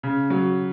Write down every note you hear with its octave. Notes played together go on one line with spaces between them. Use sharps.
C#3
F#3